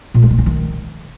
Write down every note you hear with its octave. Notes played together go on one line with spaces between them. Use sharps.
A#2
A3
G#3
C#4
D#3